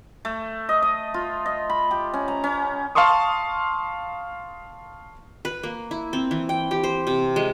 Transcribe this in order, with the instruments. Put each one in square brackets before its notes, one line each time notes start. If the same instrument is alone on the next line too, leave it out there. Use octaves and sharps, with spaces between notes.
[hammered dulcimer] A3
D#5
D#5
F4
D#5
B5
G4
C#4
A#5
C#4
[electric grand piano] F5 A5 C6 C#6 D#6
[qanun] B4
A#3
E4
C4
E3
G5
G4
C5
C3
G#3